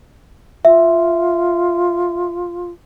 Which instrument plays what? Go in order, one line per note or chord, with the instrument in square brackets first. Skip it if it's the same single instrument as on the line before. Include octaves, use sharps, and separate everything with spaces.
[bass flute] F4 [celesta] E5